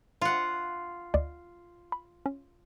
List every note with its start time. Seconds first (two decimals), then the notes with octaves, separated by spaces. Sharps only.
0.21 F4 F#5
1.14 D2 D5 D#5
1.92 B5
2.26 C#4